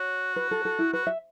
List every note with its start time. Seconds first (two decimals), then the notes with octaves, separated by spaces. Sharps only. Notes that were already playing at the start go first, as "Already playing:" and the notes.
Already playing: F#4 C#5
0.36 B4
0.51 A4
0.65 A4
0.79 E4
0.93 F#4 B4
1.07 E5